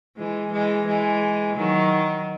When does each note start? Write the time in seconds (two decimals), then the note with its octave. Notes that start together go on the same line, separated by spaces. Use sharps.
0.17 E3 G#3
0.52 E3 G#3
0.87 E3 G#3
1.56 D#3 F#3